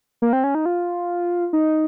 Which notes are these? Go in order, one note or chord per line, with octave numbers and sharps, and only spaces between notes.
A#3
C4
C#4
D#4
F4
D#4